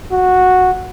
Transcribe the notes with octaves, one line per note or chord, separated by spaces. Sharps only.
F#4